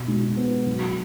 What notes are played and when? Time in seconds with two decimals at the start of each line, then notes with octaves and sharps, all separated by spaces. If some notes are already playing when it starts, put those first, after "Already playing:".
Already playing: B2
0.08 G#3
0.37 B3
0.66 F#3